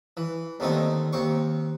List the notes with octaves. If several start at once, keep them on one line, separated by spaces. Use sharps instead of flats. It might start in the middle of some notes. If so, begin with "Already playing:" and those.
E3
D#2 D3 A3 C4 D#4
D#2 C4 C#6